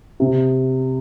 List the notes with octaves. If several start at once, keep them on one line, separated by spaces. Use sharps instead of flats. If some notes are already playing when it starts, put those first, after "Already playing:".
C3